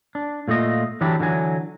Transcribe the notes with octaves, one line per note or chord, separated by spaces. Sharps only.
D4
A#2 A3 F4 D#5
D3 E3 F#3 D4 E4 G4
D3 E3 F#3 G#5